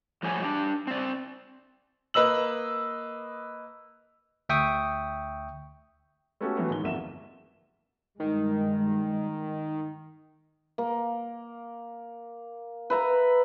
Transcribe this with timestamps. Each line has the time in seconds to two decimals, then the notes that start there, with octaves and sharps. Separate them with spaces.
0.23 A2 F3 G3 G#4 C#5 G#5
0.43 D4 G4
0.87 C4 D5
2.14 A#3 B4 D#5 E6 F#7
4.49 D2 E5 G5 C#6 D#6
6.41 A3 B3 C#4 F#4 G4 A4
6.57 E3 F#3 A3 B3
6.70 G#2 D#3 G7
6.83 G1 F2 A#3 E5 E7
8.20 G2 D#3 G3 G#3
10.78 A#3
12.90 B4 E5 A#5